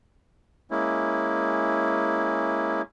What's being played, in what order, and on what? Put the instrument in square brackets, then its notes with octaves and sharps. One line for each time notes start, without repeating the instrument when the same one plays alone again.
[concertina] G#3 A#3 C#4 E4